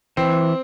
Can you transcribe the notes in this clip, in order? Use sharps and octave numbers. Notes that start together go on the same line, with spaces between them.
E3 C4